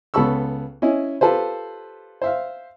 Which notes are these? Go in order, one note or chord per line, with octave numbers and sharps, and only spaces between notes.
C#2 B3 A4 B5 C#6 E6
C#4 E4 D#5
F4 G4 A4 B4 C5
C5 E5 F5